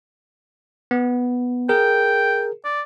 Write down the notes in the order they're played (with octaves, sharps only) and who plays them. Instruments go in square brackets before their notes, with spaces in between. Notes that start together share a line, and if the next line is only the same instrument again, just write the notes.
[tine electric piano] B3
[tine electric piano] G#4 A#4 [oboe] G5
[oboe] D5